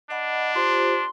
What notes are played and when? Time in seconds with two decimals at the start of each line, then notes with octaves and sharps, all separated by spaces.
0.10 D4 D#5 F#5 B5
0.55 F4 G4 C5 C6